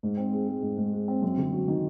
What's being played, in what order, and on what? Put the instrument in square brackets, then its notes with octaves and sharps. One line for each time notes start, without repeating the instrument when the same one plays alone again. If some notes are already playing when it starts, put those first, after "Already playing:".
[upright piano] G#2
C4
G#3
G#3
G#2
G#2
G#3
C4
F#2
G1
F#3
D#3